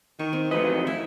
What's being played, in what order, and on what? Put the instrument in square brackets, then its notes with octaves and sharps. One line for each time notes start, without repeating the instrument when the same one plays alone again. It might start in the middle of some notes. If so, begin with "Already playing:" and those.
[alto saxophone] D#3 [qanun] C#6
[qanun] C4
[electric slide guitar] F2 D#5 [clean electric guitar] E3 F#3 A3 [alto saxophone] B4
[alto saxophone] D#3
[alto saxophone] E4 [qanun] E5